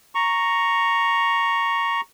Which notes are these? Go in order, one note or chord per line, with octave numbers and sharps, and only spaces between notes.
A#5 C#6